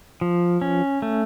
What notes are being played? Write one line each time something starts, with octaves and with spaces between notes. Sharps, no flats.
F3
C#4
A3